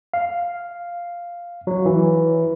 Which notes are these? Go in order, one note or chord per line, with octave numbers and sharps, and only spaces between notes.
F5
F#3
E3